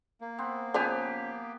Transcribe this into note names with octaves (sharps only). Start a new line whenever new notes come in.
A#3
B3 C4
C#3 F3 B3 G4 C5 G#5